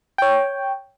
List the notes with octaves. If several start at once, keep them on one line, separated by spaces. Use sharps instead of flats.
C#5 G5